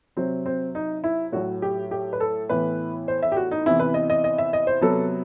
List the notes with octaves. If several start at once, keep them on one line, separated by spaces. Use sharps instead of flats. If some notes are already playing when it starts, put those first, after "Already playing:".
C3 F#3 C4
C4
D#4
E4
A2 F#3 A3 F#4
G4
G4
B4
A4
A2 E3 B3 B4
C5
E5
G4
F#4
D#4
C3 E3 B3 E4
B4
D#5
D#5
D#5
E5
D#5
C5
C3 F#3 B3 A4